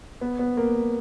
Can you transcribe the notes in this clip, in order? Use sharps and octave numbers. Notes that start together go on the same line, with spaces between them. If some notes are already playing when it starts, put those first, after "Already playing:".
B3
B3
A#3